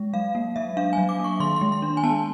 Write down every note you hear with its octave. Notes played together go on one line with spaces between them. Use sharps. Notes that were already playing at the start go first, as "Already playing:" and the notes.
Already playing: G#3
F#3 F5
A#3
F#3 E5
D4 F5
F#3 G#5
D6
A#3
C#6
D#3 C6
G#3 C6
C6
D4
G#5
B3 A5